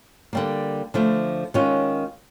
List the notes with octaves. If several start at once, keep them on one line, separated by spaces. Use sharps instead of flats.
D3 G3 A#3
D3 F3 A3
D#3 G#3 C#4 F4